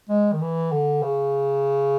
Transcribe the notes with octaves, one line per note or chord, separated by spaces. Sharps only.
G#3
D#3
E3
D3
C#3